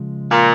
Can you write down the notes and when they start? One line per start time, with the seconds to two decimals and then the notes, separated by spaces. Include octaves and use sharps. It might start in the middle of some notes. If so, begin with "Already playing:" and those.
Already playing: C#3 F3 G#3
0.31 A#2